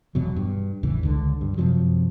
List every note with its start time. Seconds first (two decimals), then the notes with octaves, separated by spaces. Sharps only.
0.15 E1 E2 B2 F#3
0.36 G2
0.83 A1 E2 C#3 E3
1.03 C#2 D3
1.41 G2
1.58 F#2 C3 F3 F#3